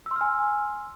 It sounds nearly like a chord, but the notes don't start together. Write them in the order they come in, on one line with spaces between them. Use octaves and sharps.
E6 C6 F6 G#5